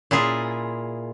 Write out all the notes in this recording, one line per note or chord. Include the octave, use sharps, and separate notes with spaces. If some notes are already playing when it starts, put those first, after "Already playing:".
A#2 E4 F4 G#4